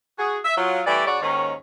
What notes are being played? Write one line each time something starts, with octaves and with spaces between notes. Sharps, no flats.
F#4 G#4
E5
F#3 F4
E3 G3 A3 E4 D5
C#3 F#4 C#5 D5
D#2 G#2 D#3 C#4 A#4 C#5